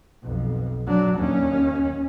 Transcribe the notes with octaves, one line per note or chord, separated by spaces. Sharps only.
B1 F2
F#3 D4
D#2 C#4